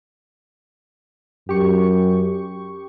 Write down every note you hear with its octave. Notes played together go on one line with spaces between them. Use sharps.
F#2 G4 C#6